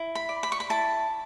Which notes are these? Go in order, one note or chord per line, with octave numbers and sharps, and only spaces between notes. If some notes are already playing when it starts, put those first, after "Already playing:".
Already playing: E4
B5
D5
B5
C#6
B5
E4 A5